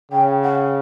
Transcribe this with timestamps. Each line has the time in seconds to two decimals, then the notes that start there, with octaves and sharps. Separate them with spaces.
0.11 C#3 G5
0.43 F#5